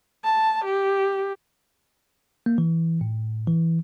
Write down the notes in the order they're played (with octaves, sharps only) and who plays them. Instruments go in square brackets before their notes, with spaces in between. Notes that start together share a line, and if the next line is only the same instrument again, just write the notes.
[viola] A5
G4
[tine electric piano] A#3
E3
A2
E3